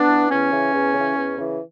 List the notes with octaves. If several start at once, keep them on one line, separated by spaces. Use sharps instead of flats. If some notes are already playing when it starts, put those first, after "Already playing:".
Already playing: B3 D4
E3
E2 C#4
C#3 E3
E2
C#3 E3
E2
C#3 E3